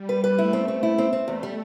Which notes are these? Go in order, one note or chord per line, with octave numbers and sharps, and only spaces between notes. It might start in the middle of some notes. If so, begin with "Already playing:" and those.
Already playing: G3
B4
B4
A3 E4
C4
C4
E4
C4
C4
E2 A3
G3